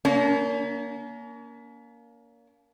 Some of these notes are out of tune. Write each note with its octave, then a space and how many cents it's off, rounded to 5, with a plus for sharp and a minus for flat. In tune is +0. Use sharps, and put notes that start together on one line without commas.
A#3 +5 C#4 +40